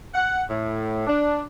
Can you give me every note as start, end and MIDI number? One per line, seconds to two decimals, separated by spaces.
0.13 0.42 78
0.48 1.03 45
1.06 1.42 62